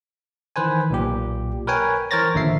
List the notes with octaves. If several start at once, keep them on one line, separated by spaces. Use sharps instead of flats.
D#3 E3 B4 C5 G#5
B1 A#2 G4
A#4 B4 C#5 G5 G#5
E3 A#4 C5 C#5 A6 A#6
A1 D#2 D3 F3 E5 C7